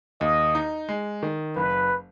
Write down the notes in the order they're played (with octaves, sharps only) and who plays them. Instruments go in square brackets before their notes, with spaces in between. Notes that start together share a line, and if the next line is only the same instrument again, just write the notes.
[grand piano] D#2 [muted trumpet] D#5
[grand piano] D#4
G#3
D#3
[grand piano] F#1 [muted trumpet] B4